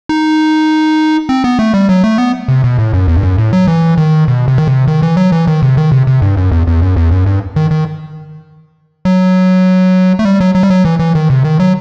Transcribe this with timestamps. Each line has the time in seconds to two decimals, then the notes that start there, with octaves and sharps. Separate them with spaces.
0.09 D#4
1.29 C4
1.44 B3
1.59 A3
1.74 G3
1.89 F#3
2.04 A3
2.18 B3
2.48 C3
2.64 B2
2.78 A2
2.93 F#2
3.08 E2
3.17 G2
3.23 F#2
3.38 A2
3.53 F#3
3.67 E3
3.98 D#3
4.28 B2
4.48 C3
4.58 D#3
4.67 C3
4.88 D#3
5.02 E3
5.17 F#3
5.32 E3
5.47 D#3
5.62 C3
5.77 D#3
5.92 C3
6.07 C3
6.22 G2
6.37 F#2
6.52 E2
6.67 E2
6.82 F#2
6.96 E2
7.11 F#2
7.26 G2
7.56 D#3
7.71 D#3
9.05 F#3
10.19 A3
10.25 G3
10.40 F#3
10.55 F#3
10.63 G3
10.70 F#3
10.85 E3
10.99 E3
11.15 D#3
11.30 C3
11.44 D#3
11.60 F#3